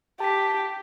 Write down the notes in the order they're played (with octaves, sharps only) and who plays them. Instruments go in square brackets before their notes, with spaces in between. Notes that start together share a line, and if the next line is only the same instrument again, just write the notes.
[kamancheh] G4 [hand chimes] A5 B6